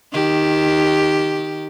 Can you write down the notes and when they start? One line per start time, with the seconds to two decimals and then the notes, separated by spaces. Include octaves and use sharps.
0.13 D#3 G4